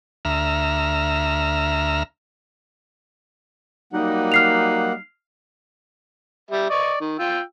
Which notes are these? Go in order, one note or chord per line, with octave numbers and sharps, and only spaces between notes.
D2 E5 A#5 F6
F#3 G3 A#3 D#4 F#5
F6 C7 F7
G3 E5
D5 D#5 C#6
D#3
F4 G5 E6